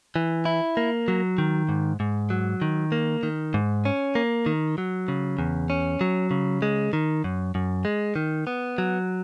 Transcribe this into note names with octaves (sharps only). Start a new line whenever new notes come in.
E3
E4
A#3
F#3
D#3
G#2
G#2
F#3
D#3
A#3
D#3
G#2
C#4
A#3
D#3
F#3
C#3
E2
C#4
F#3
C#3
G#3
D#3
F#2
F#2
G#3
D#3
B3
F#3